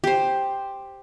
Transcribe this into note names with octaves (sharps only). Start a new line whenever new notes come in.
G4 C5